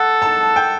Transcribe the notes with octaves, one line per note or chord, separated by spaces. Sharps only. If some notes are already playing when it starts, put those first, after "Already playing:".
Already playing: A4 F#5
A5
G5